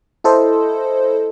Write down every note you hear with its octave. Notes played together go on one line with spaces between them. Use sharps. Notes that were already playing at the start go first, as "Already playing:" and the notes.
E4 A4 C5 D#5